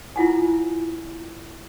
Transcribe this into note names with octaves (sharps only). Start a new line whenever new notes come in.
E4 F4 F#5 G#5